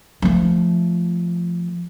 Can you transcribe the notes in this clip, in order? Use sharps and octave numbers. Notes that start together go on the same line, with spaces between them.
F3 A3